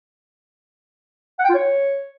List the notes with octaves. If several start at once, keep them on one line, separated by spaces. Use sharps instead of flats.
F#5
G5
F4
C#5